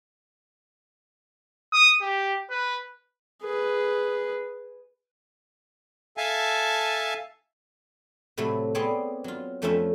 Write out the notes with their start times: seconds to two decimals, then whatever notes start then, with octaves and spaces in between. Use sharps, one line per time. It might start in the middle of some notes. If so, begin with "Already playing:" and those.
1.73 D#6
2.02 G4
2.50 B4
3.42 G#4 B4
6.17 A4 E5 F5 G#5 A5
8.37 A2 C3 F#3 A3
8.75 B3 C4 G#4 C#5 D5 C6
9.24 F#3 F4
9.62 F2 F3 A3 C#4 F4 E5